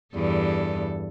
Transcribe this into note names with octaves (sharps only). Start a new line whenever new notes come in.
E2 G2 A4